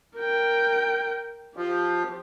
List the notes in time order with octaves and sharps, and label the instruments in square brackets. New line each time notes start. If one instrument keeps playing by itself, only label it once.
[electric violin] A#4 G5
[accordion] F3 [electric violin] G4